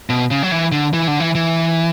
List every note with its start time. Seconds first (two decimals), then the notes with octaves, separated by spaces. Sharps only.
0.09 B2
0.31 C#3
0.43 F#3
0.52 E3
0.72 D3
0.93 E3
1.08 D3
1.20 E3
1.35 E3